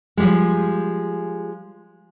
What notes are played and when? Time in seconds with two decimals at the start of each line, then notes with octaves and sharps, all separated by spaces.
0.17 F3 G3 G#3